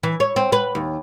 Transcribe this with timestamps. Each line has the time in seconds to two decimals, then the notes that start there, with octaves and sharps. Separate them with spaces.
0.03 E3
0.20 C#5
0.36 C4
0.52 B4
0.75 D#2